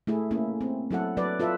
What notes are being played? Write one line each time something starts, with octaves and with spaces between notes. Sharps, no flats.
A3 E4 G#4
A#3 C#4 E4
C4
F#3 E4 A4 F#5
F#3 A4 B4 D5
F4 A4 B4 E5